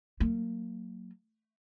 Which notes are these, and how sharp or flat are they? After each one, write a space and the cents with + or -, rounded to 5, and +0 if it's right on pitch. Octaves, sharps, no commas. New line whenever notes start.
F#3 +0 A#3 -25